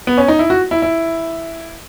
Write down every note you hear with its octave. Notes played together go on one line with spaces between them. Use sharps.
B3
C#4
D#4
E4
F#4
E4
E4